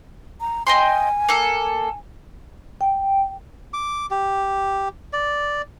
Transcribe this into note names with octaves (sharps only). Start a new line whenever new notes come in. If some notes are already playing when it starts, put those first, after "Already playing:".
A#5
D#5 G5 G#5 C6
A#3 A4
G5
D6
G4
D5